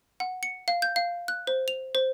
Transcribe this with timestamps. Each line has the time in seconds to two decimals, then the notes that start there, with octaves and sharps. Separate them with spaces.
0.20 F#5
0.43 C#7
0.68 F5
0.82 G6
0.96 F5
1.28 F#6
1.47 C5
1.68 F7
1.95 C5